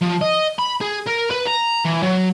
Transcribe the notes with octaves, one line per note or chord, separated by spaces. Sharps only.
F3
D#5
B5
G#4
A#4
B4
A#5
E3
F#3